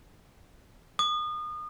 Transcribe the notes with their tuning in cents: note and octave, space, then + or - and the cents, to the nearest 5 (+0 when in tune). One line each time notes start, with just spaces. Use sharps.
D#6 -30